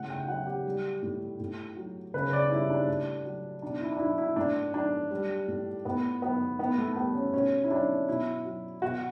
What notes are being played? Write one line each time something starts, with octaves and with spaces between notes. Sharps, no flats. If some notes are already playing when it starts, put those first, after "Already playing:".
Already playing: A2 C#3 G3 F#5
G5
F#3 F#5
G4
G3
A2
A2
F#3
C#3 B4
D5
G3 E4
D4
A2
F#3
B2 D4
E4
D4
F#3 E4
E4
A2 D4
F#3 D4
G3
A2
A2 B3
F#3 B3
A2 B3
A3
G3 B3
C#4
B2 C#4
E4
F#3 D4
B2 E4
F#3
B2 F#4